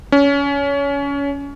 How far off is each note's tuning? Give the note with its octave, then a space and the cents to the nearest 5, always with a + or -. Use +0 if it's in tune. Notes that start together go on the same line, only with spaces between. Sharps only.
C#4 +25